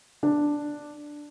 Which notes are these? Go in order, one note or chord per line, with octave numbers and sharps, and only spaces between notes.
D4